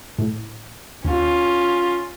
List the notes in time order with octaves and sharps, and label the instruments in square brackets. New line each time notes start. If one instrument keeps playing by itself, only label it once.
[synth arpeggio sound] A2
[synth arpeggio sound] D#2 [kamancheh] C#4 F4